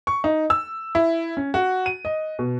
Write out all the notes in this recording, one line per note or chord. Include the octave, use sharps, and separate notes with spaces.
C#6
D#4
E6
E4
C#4
F#4
D#7
D#5
B2